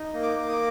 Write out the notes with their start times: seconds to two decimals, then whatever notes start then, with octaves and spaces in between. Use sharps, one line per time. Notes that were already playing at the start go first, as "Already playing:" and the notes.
Already playing: D#4
0.14 A#3
0.22 D6
0.37 A#3
0.48 D#6
0.53 D6